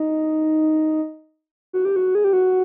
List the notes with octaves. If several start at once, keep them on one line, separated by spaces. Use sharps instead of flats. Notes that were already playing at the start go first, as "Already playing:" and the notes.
Already playing: D#4
F#4
G4
F#4
G#4
G4
F#4